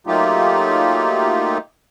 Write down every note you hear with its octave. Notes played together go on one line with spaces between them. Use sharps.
F#3 A3 A#3 D#4 F4 G4